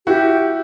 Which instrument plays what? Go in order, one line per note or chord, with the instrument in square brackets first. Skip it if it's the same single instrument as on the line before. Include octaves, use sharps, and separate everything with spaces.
[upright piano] E4 F#4 [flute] G4